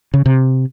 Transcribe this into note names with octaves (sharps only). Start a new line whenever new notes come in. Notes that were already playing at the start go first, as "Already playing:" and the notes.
C#3
C3